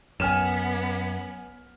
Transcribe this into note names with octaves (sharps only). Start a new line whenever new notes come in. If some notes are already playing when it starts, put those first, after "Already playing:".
F#2 B3 G#5 F6 E7